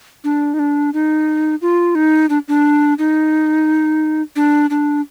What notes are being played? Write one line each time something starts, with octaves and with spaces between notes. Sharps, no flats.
D4
D#4
D4
D#4
F4
D#4
D4
D4
D#4
D4
D4